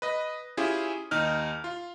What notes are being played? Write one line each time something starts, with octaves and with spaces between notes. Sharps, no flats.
B4 D#5
C#4 E4 F4 G4 G#4
D#2 D#4 F6
F4